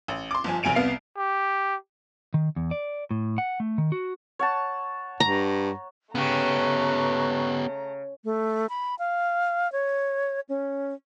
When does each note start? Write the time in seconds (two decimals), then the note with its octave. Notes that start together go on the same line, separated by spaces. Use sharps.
0.08 A1
0.31 C6 D6
0.44 G1 F3 G#5
0.63 F1 B1 E2 G#5 D7 F7
0.75 C2 B3 F5 C7
1.18 G4
2.34 D#3
2.56 E2
2.71 D5
3.11 A2
3.38 F#5
3.60 A3
3.78 D#3
3.92 F#4
4.39 C#5 F#5 A5
5.20 G2 A#5
6.15 C#3 A3 B3 G4 B4 A#5 C#6 F#6
8.23 A3
8.69 B5
8.99 F5
9.72 C#5
10.49 C#4